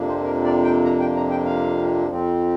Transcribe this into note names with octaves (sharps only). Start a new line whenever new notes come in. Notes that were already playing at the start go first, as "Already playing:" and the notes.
Already playing: F2 C3 F3 A#3 D4
C5
A#4
D5
G5
A#5
G5
A#5
G5
F5
F2 F3 C4